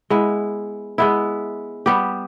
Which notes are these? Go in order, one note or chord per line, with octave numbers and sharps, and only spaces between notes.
G#3 B3 E4
G#3 B3 E4
G3 B3 G4